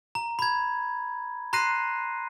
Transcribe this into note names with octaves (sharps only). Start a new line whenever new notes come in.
A#5
B5 G#6
A#5 C6 F#6 A#6 C7 D#7